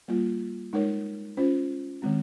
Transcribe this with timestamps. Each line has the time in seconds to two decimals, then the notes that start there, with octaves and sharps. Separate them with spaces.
0.08 G3 A#3 F4
0.73 G#3 D#4 A#4 C#5
1.37 C#4 F4 C5
2.02 D#3 G#3 C4